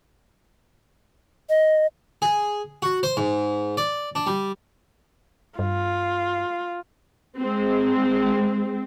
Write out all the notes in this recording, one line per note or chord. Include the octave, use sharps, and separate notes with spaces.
D#5
G#4
F#4
C5
G#2
D5
D4
G3
G2 F4
G#3 C4